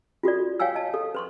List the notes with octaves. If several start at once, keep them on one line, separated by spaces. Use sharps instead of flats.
F4 F#4 A4 D5
C#5 F5 G5 G#5 E6
D#5 A5
A4
B4 C6 C#6